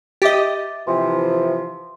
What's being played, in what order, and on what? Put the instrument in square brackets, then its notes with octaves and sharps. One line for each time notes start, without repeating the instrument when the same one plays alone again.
[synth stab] G4 D#5 [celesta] E5 D6 A6
[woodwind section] C3 E3 F3 [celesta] C6